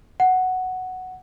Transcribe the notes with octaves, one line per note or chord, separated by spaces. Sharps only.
F#5